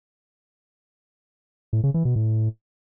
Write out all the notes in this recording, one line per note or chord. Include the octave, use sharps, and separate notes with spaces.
A2
C#3
E3
B2
A2